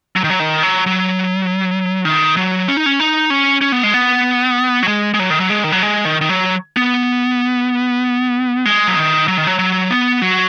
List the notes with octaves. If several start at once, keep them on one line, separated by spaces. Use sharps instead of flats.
F#3
D#3
F#3
D#3
F#3
F#3
D#3
F#3
C#4
D#4
C#4
D#4
C#4
C#4
B3
G#3
B3
F#3
G#3
G#3
F#3
D#3
F#3
G#3
D#3
F#3
G#3
D#3
D#3
F#3
B3
G#3
F#3
D#3
F#3
D#3
F#3
F#3
B3
F#3